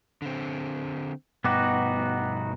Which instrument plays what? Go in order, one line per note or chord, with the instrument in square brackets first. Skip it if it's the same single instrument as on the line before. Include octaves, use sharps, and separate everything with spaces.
[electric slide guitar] D3 C4
[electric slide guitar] G2 B2 [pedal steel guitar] B3 D#4 F#4 [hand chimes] G5 D6 F#6